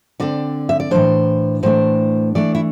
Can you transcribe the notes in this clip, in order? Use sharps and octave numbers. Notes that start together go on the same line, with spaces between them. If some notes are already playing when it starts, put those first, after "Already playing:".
D3 C4 D5
E5
D5
A2 E3 A3 D4 C5
A2 E3 A3 D4 C5
E3 A3 D4 D5
E4